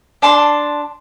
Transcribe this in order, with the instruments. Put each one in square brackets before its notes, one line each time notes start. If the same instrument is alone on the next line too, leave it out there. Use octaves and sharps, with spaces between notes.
[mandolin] D4 A5 C6